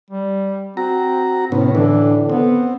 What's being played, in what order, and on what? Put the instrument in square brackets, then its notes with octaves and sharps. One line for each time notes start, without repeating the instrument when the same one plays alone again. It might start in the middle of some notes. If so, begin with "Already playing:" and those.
[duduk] G3
[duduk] C4 [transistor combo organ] F#4 A#5
[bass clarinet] A2 [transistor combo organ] C3 B3 C#4
[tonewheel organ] D3 [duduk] E3 [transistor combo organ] D4
[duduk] B3 [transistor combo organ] C4